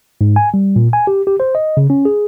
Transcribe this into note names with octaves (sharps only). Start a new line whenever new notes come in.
G#2
G#5
G3
A#2
G#5
G4
G4
C5
D#5
C#3
C#4
G#4